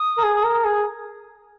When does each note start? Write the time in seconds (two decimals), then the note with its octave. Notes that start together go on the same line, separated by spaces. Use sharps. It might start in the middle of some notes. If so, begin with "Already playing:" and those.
Already playing: D#6
0.18 A#4
0.23 G#4
0.44 A#4
0.65 G#4